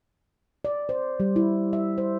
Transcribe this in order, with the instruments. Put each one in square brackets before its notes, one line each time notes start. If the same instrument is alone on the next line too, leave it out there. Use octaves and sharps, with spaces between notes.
[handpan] D5
C5
G3
E4
E5
C5